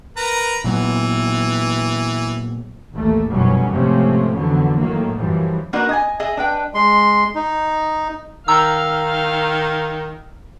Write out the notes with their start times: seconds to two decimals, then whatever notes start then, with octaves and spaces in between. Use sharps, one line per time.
0.17 A#4 B4 A#5
0.64 A#2 E3 F#3 B3
2.93 A1 D#2 A3 A#3
3.29 F1 F#2 B2 F#3 G3 C#4
3.72 G#2 C3 F3 A3 C4 C#4
4.34 F2 D3 E3 F#3 B3
4.78 A2 D#3 F#3 A#3
5.16 F#2 E3 F3 G3
5.73 A#3 D4 D#4 F#4 A#4 B4
5.89 D#5 G#5
6.20 G#4 D#5 E5 G#5
6.37 D4 B4 G5
6.74 G#3 C6
7.35 D#4
8.48 D#3 F5 A#5 E6